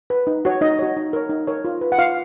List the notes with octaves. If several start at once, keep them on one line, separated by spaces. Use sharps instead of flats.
B4
D#4
F#4 C#5
D#4 D#5
F#4 C#5
D#4
A#4 C#5
D#4
A#4 C#5
F4
B4
F#5
F4 F5